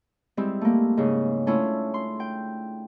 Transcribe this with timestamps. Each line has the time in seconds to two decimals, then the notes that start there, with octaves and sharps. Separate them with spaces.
0.37 G3 G#3 C4 E4
0.61 A3 A#3
0.97 G#2 C#3
1.47 A3 C#4 D4 E4 F4
1.94 C6
2.20 G5